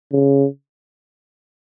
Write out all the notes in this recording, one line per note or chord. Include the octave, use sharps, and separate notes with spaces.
C#3